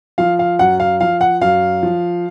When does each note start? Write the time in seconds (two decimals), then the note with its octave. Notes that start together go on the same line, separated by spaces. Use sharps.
0.18 F3 F5
0.39 F5
0.59 F#2 F#5
0.80 F5
1.01 F3 F5
1.21 F#5
1.41 F#2 F5
1.83 F3